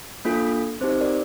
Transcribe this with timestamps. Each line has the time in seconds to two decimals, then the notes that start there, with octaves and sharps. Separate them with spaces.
0.25 A#3 D4 F4 A4
0.81 C4 D#4 G4 C5
1.00 A#4 D5